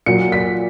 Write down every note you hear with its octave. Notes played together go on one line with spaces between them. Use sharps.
A#2 F#3 C#7
B6